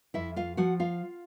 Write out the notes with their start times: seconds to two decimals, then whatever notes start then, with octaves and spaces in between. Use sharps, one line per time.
0.14 F2 E4 E5
0.36 F4 F5
0.57 F3 F#4 F#5
0.80 F4 F5